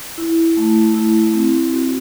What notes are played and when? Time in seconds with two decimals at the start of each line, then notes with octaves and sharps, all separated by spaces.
0.18 E4
0.57 A3
0.95 E4
1.34 C4
1.73 F#4